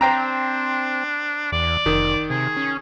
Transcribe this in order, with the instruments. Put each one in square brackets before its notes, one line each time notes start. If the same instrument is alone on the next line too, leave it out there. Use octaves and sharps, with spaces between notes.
[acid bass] C4 [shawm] D4 [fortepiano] C5 G5 A#5
[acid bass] E2 [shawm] D5
[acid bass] F1 [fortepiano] D#3
[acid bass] C3 [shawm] G#4
[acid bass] C#4